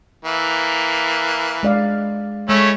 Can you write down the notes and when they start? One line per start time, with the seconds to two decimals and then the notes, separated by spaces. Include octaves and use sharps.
0.25 E3 A#3
1.63 G#3 D5 F5
2.49 G#3 A3 C#4 E4